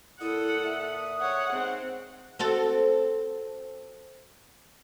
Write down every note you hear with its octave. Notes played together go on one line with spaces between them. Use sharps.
A#2 E4 A4 F#5 D#6
E5
C#5 F#5
G#2 C4
C4 F#4 A4